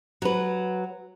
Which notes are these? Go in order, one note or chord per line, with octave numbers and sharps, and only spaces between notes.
F#3 B4